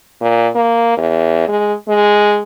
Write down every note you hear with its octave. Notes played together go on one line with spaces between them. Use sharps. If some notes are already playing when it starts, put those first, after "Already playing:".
A#2
A#3
E2
G#3
G#3